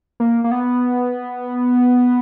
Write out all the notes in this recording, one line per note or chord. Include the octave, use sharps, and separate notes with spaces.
A#3
A#3
B3